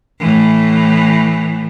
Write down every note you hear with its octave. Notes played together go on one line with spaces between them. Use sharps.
A2 E3